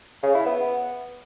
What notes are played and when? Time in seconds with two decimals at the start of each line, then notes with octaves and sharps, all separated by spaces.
0.23 C#3
0.34 E4
0.46 B3